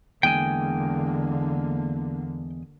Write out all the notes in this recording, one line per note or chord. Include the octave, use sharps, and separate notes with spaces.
E2 D3 G#3 A#3 G5 G#5